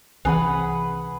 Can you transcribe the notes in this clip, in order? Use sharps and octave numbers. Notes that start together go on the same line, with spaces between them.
C2 E3 C4 G#4 B4 F#5